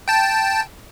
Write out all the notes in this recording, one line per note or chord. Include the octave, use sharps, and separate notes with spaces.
G5 A5